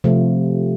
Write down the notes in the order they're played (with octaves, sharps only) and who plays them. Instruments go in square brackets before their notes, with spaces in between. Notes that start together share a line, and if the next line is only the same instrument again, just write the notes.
[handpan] C3 F3 A3